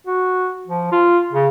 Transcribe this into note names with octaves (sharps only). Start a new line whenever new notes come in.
F#4
F3
F4
C#3